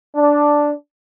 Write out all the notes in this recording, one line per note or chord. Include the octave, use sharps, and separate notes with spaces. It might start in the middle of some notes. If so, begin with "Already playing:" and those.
D4